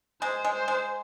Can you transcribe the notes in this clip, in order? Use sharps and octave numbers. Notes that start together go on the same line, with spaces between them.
G#3 C5
G#3
C5
G#3